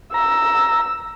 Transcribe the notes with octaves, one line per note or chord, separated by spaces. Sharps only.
A#5 E6